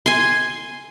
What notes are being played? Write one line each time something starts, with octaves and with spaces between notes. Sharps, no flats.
G#5 C6